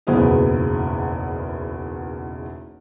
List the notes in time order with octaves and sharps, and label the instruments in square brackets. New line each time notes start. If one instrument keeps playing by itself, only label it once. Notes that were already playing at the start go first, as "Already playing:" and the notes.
[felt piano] F#1 B1 E2 B3 G#4 C5